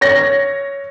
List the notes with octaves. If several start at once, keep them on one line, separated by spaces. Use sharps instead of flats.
C#5 A#6